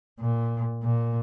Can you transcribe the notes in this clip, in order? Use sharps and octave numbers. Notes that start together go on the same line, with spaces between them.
A#2
A#2